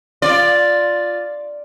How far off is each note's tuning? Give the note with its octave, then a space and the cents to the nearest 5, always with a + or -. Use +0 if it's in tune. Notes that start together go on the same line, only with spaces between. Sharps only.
F4 +0 D5 +0